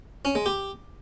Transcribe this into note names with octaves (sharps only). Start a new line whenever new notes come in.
C#4
G#3
G4